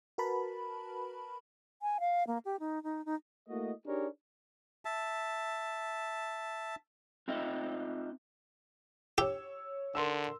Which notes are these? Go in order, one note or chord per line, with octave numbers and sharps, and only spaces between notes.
F#4 A#4 B4 A5 B5
G#5
F5
A#3
G4
D#4
D#4
D#4
A3 A#3 E4 F#4 D#5
D4 D#4 G4 G#4 A#4 C#5
E5 A5
C4 D#4 F4 D#5 E5
G4 C#5 E6
D3 A#4 C6 E6